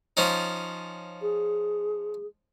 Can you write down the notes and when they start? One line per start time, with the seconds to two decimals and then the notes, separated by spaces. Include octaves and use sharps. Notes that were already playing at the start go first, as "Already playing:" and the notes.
0.17 F3 C#4 D#4
1.22 G#4